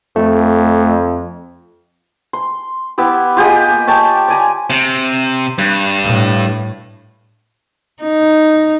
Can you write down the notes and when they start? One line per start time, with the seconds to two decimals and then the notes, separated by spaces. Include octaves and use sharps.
0.16 F2 A3
2.33 C6
2.98 B3 E4 G4
3.37 F4 G4 G#4 D#5
3.70 A#3
3.87 C#5 G5 A5
4.28 D5 G#5 A#5
4.70 C3
5.58 G2
6.04 A2
8.03 D#4